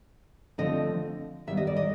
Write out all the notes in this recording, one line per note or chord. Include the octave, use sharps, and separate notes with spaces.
D3 F3 A3 C4 D#5
D#3 G3 B3 E5
D#5
D5
D#5